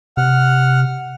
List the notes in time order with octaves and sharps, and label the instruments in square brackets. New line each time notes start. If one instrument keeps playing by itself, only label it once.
[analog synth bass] C3 [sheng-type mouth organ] F#5 F6